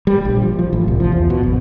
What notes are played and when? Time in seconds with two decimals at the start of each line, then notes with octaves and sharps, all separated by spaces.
0.07 G3
0.25 A#1
0.43 F3
0.59 F3
0.73 A1
0.88 C2
1.00 F3
1.12 E2
1.30 B2
1.43 G#1